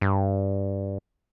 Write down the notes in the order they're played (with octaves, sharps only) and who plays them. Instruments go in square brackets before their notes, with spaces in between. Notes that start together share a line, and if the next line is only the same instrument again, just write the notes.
[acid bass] G2